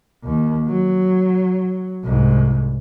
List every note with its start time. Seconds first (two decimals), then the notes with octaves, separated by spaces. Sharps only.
0.24 D#2
0.67 F#3
2.04 C2 G#2